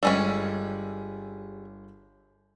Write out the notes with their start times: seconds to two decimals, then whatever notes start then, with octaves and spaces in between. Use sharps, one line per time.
0.03 G1 G3 G#3 C#4 G#5 E6